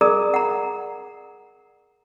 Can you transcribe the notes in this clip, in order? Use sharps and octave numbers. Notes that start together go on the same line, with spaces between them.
G#4 A#4 D5 A#5 D#6
F#5 A#5